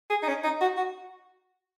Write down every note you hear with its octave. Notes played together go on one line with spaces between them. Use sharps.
G#4
D#4
C#4
D#4
F#4
F#4